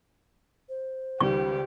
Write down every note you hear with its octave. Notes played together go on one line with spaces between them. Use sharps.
C5
C#2 D#3 G3 G4 C#6